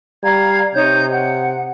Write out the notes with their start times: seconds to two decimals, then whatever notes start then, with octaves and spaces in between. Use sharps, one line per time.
0.23 G3 F5 A#5 G#6
0.75 C3 D#4 C#5 G6
1.12 F#5